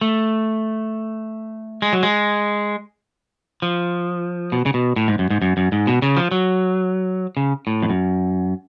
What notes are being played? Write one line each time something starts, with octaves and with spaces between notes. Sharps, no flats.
A3
G#3
F#3
G#3
F3
B2
C#3
B2
A2
G#2
F#2
G#2
F#2
F#2
G#2
B2
C#3
F3
F#3
C#3
A2
F2
F#2